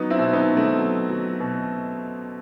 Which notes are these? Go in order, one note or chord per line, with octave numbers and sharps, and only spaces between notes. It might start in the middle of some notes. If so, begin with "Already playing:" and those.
Already playing: F#3 B3 D#4
C4 E4
B2
B3 D#4
B2
A3 C4
F#3
F#3
B2